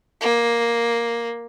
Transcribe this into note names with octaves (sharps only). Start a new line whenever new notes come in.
A#3